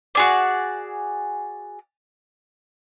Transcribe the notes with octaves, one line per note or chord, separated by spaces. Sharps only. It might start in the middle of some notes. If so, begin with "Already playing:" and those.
F#4 G#4 D5